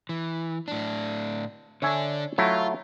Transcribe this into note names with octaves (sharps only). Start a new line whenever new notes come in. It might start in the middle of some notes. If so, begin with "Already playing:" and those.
E3
A2 D4
D3 D4 C#5 E5 G#5
F#3 A3 E4 F4